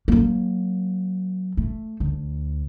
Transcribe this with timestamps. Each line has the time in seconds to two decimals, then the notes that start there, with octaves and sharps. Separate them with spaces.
0.08 F#3 A#3
1.57 A3
2.00 D2